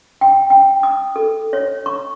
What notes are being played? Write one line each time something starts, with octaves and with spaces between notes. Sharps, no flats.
G5
G5
D#6
A4
C#5
C#6